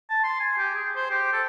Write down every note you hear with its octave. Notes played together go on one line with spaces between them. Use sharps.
A5
C6
G#5
G4
G#4
C5
G4
A4